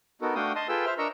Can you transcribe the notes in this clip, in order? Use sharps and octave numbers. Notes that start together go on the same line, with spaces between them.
B3 D#4 F#4 A4 A#4
A3 D4 F#4 F5 G5 D#6
D#5 A5 C6 D#6
F4 G#4 A4 B4 G5 E6
C5 E5 F6
D4 A#4 D#5 A#5 C#6 E6